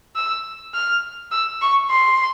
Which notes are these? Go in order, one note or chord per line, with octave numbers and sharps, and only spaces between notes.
E6
F6
E6
C#6
C6